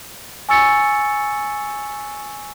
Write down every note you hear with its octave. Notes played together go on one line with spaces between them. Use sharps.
G#5 C#6 E6 A6 C#7